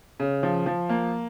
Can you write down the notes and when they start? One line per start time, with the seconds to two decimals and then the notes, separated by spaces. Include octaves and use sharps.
0.20 C#3
0.43 F3
0.66 F3
0.89 A#3